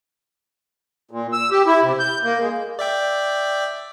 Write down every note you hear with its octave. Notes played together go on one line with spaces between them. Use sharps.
A#2
E6
G4
E4
C3
G6
A#3
G#3
D5 E5 G5